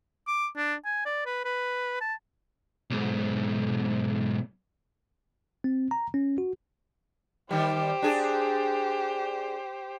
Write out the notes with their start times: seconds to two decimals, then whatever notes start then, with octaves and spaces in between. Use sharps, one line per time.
0.27 D6
0.56 D4
0.85 G#5
1.06 D5
1.26 B4
1.45 B4
2.01 A5
2.90 B1 G#2
5.64 C4
5.91 A#5
6.14 C#4
6.38 F#4
7.51 D#3 G3 G4 C5
8.02 D4 G#4